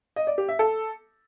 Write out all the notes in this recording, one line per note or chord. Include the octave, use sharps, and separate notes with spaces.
D#5
D5
G4
E5
A4